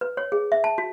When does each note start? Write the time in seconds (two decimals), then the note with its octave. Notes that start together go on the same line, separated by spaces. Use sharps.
0.01 B4
0.17 C#5
0.32 G#4
0.52 E5
0.64 A5
0.78 F#4